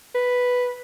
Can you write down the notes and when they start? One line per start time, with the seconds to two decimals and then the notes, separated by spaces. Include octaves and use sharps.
0.15 B4